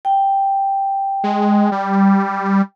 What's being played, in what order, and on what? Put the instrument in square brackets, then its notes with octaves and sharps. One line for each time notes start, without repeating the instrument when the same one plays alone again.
[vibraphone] G5
[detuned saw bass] G#3
G3